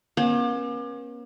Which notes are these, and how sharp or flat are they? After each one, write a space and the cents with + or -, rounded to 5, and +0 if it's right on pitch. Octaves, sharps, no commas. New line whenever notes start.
A#3 +45 C#4 -35